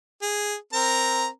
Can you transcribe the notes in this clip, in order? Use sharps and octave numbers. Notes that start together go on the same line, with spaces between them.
G#4
C4 A#4 A#5